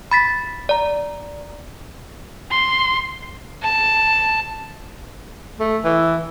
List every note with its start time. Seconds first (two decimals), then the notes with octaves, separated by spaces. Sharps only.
0.11 B5 A6 B6
0.69 D5 A#5
2.51 C6
3.63 A5
5.60 A3
5.84 E3